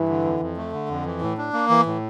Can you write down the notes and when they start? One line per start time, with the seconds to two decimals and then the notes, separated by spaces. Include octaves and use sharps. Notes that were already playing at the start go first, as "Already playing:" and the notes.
Already playing: G2 E3
0.09 D3
0.25 F2
0.40 F2
0.57 A3
0.72 D3
0.89 F2
1.05 E3
1.21 A2
1.38 D4
1.53 A#3
1.70 E3
1.86 A2